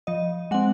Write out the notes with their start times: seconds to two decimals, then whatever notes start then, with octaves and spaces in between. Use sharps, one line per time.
0.07 F3 D#5
0.51 G#3 C4 F#5